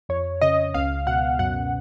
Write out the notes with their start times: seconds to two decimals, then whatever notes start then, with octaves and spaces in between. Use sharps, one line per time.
0.09 F2 C#5
0.41 C#3 D#5
0.74 C#2 F5
1.07 B2 F#5
1.39 F#2 F#5